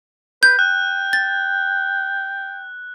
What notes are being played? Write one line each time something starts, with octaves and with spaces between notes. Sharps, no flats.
B4 G6
G5 F#6
A6